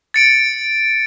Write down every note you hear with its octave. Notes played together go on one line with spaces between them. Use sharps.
A6 C#7 D7